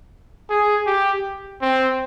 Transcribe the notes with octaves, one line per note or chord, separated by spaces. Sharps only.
G#4
G4
C4